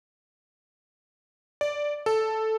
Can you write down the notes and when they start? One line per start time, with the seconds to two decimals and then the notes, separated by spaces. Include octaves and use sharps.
1.61 D5
2.06 A4